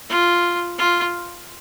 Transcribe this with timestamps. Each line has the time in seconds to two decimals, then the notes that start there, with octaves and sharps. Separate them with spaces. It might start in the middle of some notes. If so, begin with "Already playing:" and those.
0.10 F4
0.78 F4